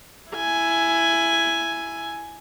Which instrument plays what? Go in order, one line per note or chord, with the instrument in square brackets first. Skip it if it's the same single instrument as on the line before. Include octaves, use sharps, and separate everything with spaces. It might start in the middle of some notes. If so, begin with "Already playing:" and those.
[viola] E4 G#5